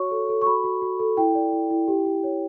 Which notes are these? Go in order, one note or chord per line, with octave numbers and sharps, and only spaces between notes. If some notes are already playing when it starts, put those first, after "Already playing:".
Already playing: F#4 C#5 C#6
A4
A4
C#6
F#4 B5
F#4
F#4
A4
E4 G5
D5
E4
E4
G4
G4
C#5